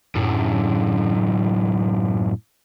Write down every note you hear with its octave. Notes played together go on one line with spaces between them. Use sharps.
F#2 A2